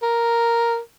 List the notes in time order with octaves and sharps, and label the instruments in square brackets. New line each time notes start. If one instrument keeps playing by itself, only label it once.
[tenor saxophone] A#4